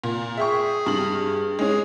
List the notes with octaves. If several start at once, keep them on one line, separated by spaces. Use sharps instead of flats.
A#2
G#4 E5 G5 C#6
G2 F#7
G#3 C#4 G#4